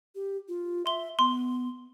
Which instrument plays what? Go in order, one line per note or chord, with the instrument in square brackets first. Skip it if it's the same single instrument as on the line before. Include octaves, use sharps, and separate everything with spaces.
[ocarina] G4
F4
[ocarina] E5 [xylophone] C6 G7
[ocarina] B3 [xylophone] C6